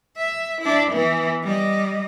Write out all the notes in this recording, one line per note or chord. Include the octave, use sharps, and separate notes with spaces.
E5
D4 E4
E3 B3
G3 D#5